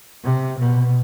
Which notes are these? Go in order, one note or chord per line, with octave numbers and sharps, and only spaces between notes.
C3
B2